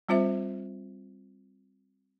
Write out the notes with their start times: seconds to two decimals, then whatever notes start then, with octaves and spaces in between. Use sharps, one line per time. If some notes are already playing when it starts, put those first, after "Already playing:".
0.09 G3 C4 F4 C5 E5